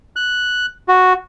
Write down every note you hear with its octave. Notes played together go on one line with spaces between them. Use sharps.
F#6
F#4